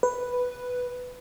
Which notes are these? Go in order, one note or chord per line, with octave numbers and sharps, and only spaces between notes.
B4